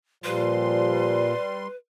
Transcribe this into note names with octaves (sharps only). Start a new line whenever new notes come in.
A#2 F3 G3 B4 C6